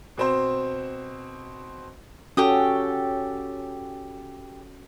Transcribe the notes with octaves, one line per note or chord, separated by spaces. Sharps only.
B2 C4 C5
C#4 F#4 G4 A4 G5 D#6